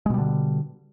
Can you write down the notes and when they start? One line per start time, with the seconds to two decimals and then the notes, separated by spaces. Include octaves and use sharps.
0.06 G#3
0.10 B2
0.14 G3
0.18 D3